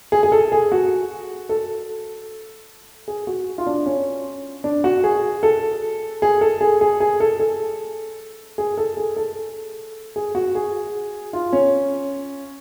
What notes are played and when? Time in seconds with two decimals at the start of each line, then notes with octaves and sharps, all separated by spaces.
0.12 G#4
0.23 G#4
0.32 A4
0.52 G#4
0.72 F#4
1.49 A4
3.08 G#4
3.27 F#4
3.58 F4
3.67 D4
3.86 C#4
4.64 D4
4.84 F#4
5.04 G#4
5.43 A4
6.22 G#4
6.41 A4
6.61 G#4
6.81 G#4
7.00 G#4
7.20 A4
7.40 A4
8.58 G#4
8.78 A4
8.97 G#4
9.16 A4
10.16 G#4
10.35 F#4
10.55 G#4
11.33 F4
11.53 C#4